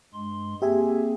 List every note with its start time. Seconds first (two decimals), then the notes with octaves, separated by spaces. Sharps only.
0.14 G2 G#3 C6
0.62 A#3 C4 G4 G#4 E5 G#5